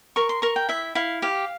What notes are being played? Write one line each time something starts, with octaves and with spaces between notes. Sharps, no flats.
A#4 C#6
C6
A#4 C#6
G5
E4 E5
E4 F5
G4 F5